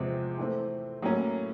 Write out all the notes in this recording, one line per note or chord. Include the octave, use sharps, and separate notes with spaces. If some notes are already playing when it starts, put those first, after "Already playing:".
Already playing: E2 C3 F3 G#3 C4
E3 A3 C4
A2 F#3 A#3 C#4